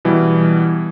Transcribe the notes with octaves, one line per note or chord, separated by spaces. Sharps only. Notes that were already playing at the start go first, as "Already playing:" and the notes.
B2 E3 G3